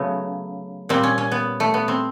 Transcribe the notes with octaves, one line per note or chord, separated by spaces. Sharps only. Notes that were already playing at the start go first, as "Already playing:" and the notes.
Already playing: C#3 F#3 A3 B3
A#2 G3 C4
C#4
C#4
B3
A3
B3
C4